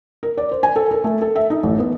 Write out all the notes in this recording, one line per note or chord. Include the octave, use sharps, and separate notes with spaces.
A#4
D5
C5
G#5
A4
A#4
A3
A4
E5
D#4
A1
B3